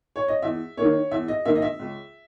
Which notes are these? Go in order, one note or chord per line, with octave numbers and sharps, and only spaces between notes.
C#5
D#5
E2 E5
D#3 A#3 C#5
E2 E5
D#5
D#3 A#3 E5
D#5
E5
C#2